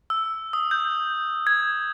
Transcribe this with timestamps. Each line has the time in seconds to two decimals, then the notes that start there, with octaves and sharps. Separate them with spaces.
0.10 E6
0.53 D#6
0.71 G6
1.47 G#6